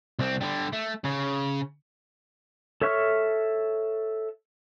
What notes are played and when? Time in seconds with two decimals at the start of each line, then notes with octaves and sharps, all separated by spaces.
0.19 C2 C4
0.41 D3 G3
0.73 A3
1.05 C#3
2.82 A4 C#5 E5 C#6 F6